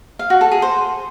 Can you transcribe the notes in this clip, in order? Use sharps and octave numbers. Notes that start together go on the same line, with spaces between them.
F5
F#4
A4
G#4
C5